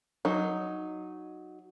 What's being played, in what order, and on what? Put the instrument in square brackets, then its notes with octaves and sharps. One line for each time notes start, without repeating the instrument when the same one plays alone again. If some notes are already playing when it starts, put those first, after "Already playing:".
[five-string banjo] F#3 D#4